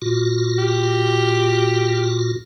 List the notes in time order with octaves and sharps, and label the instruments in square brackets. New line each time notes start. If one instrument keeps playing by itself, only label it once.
[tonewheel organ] A#2 F4 F#4
[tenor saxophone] G4